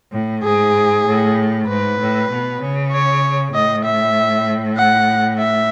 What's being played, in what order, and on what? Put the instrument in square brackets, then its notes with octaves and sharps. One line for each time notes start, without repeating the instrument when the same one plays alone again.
[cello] A2
[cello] G#2 [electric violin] G#4
[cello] A2
[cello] G#2 [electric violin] B4
[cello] A2
B2
C#3
[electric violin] C#5
[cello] A2 [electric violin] D#5
[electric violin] E5
F#5
E5